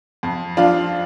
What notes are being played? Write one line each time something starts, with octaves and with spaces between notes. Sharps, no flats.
F2
F3 D4 F4